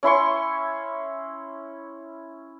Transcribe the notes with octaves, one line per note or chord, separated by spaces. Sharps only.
C#4 E4 C6 C#6